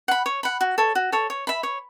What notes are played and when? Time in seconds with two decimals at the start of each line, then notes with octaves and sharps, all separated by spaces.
0.08 F#5 B5
0.26 C#5
0.43 F#5 B5
0.61 F#4
0.78 A4 C#5
0.95 F#4
1.12 A4 C#5
1.30 C#5
1.47 E5 B5
1.63 C#5